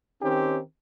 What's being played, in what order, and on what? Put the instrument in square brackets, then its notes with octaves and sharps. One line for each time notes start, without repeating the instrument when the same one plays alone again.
[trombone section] D#3 C4 C#4 D#4 G4